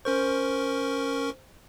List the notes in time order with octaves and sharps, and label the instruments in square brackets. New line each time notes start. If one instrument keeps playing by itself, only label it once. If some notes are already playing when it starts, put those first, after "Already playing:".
[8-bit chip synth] C#4 A#4 C#6 [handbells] C5